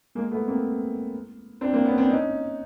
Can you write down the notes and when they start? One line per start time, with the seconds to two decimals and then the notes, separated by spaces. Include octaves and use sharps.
0.15 G#3 A#3
0.31 A3 B3
0.48 A#3 C4
1.61 C4 D4
1.73 A#3 C4
1.85 B3 C#4
1.98 C4 D4
2.10 C#4 D#4